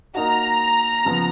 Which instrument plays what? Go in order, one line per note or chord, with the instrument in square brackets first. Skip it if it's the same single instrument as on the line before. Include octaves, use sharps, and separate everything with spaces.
[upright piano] A#3 D#4 F#4 [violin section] A#5
[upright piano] C#3 F3 B3